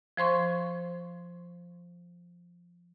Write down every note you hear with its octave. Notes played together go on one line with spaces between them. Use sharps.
F3 C5 C6 C#6